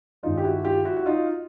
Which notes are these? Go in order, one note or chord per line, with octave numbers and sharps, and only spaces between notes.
G2 D#3 G#3 D#4 F4
G4
E4 F#4
F4 G4
E4 F#4
F#4
D#4 F4